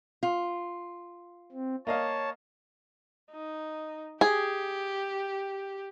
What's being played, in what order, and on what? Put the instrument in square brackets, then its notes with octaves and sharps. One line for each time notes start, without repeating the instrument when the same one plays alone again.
[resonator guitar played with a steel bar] F4
[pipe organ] C4
[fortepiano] A#3 D#5 F5 [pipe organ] C#5 A5
[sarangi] D#4
[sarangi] G4 [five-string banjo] G#4